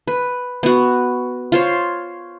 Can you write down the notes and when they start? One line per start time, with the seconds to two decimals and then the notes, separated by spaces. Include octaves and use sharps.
0.08 B4
0.63 B3 F#4
1.52 F4 C5 C#5